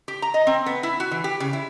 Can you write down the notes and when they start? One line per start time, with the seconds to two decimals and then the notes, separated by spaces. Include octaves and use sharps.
0.08 G4
0.22 A#5
0.34 D#5
0.47 C4
0.66 B3
0.83 E4
1.00 F#4
1.11 E3
1.24 G4
1.40 C#3
1.53 E4